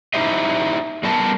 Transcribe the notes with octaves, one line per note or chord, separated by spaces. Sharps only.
D#4 E4 G4 C5 D#5 E5
A2 G3 B3 A#4 A5